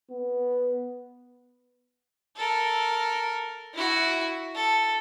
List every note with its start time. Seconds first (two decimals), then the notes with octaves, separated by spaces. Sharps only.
0.10 B3
2.36 A4 A#4
3.74 E4 F#4
4.54 A4